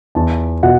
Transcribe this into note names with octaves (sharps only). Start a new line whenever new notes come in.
E2 A5
B2 F#5